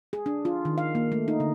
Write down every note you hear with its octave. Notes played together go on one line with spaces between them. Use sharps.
G#4
D4
F4
D#3
F5
A#3
A3
D#4
D3